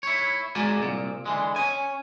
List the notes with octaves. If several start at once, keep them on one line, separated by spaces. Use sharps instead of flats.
E4 C#5
G#3 F#4 G#4 A#4 D5 G#5
C2 A#2
D3 E3 G#3
C#4 G#5